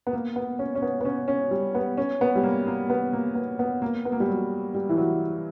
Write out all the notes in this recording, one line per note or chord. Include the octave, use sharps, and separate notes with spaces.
B3
A#3
B3
C#4
C#4
B3
B3
C#4
C#4
G3
B3
C#4
B3
G3
A#3
A#3
B3
A#3
B3
B3
A#3
B3
A#3
G3
F#3
G3
E3
F#3